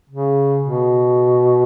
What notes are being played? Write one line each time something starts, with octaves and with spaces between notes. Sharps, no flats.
C#3
B2